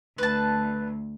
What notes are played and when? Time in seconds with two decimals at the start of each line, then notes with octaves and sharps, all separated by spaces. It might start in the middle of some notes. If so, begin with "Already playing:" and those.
0.18 D2 B4 A5